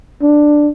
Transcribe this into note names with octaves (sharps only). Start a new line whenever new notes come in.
D4